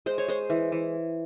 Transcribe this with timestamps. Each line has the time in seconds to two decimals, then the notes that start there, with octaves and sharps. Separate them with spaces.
0.06 G#3 C5
0.18 C#5
0.28 G#3 C5
0.50 E3
0.72 E3